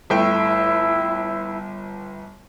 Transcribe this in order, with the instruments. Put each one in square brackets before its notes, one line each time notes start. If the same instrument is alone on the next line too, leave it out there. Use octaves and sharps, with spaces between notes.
[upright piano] G1 A3 G5 [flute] E4